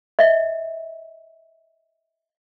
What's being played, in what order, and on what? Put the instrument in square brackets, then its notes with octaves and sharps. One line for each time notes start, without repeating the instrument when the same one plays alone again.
[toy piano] D#5 E5